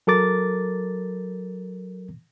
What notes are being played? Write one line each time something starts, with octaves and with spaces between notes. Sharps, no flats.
F#3 A4 A#4 D6 A6